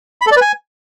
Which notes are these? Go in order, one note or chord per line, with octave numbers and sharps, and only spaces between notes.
B5
A4
D5
B4
G#5